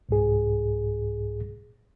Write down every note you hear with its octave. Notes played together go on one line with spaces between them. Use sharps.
C2 G#2 G#4